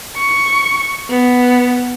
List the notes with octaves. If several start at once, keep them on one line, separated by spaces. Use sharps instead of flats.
C#6
B3